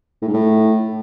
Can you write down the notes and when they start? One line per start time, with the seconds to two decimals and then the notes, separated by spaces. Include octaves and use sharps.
0.22 A2
0.28 G#2
0.34 A2